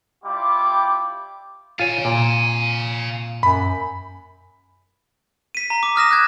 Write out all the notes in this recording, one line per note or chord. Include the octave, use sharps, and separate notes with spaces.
G3 E4 F4 G4 D6
F4 C#5 F5 G#5
A#2
F#2 B5
B6 D#7
A#5
D6
D#6 F6 A#6 E7
F#6 G#6